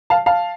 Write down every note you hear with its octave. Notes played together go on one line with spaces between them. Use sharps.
F5 A5
F5 A5